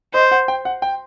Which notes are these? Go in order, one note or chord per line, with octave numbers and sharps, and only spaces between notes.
C5 D#5
F#5
G5
F#5
G5